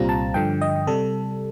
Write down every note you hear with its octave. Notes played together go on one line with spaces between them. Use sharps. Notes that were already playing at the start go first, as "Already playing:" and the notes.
Already playing: C2 A#2 G3 C4 F4 A#5
A5
G2 D3 F3 G5
D#5
C3 G3 A4